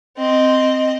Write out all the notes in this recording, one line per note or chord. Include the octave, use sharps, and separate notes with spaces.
C4 D#5